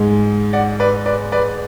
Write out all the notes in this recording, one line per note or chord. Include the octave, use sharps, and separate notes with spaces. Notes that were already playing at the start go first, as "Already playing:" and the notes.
Already playing: G#2 G#3
D5 F#5
B4 D5
B4 D5
B4 D5